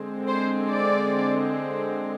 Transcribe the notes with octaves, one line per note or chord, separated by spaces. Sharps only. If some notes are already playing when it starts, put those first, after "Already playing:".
Already playing: D3 G#3 C4
C5
D5